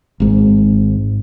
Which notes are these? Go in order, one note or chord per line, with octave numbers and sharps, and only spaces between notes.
G#1 G#2